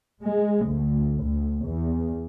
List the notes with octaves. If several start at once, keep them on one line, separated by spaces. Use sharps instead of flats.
G#3
D2
D2
E2